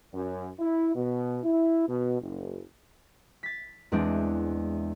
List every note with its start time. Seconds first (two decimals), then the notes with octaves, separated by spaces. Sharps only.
0.14 F#2
0.60 E4
0.96 B2
1.44 E4
1.89 B2
2.21 F#1
3.43 A6 B6
3.92 E2 G#3 C4 D4